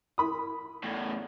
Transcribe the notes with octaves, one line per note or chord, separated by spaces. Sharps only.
E4 B5 D#6
E2 A2